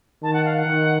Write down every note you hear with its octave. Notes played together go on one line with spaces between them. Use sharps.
D#3 A5
F#5
F5
F#5
D#3